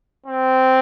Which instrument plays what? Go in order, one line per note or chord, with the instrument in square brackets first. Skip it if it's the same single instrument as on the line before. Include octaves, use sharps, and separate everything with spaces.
[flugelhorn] C4